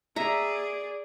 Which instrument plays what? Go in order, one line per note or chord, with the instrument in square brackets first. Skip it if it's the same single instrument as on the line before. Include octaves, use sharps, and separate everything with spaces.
[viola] G#4 D5 [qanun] E5 A#5